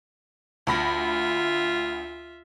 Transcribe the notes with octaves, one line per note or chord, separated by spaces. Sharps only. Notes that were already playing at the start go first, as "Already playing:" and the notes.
D2 F4 E5 B5 A#6